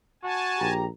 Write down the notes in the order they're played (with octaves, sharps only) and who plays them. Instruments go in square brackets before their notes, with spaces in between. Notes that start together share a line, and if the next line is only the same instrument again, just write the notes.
[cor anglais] F#4 [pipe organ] G#5 A5
[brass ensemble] A#1 G4 A#5